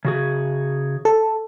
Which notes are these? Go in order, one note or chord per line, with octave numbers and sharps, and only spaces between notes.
C#3 F#4 G#4
A4